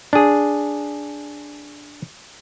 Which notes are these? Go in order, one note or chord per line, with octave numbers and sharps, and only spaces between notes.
D4 G#4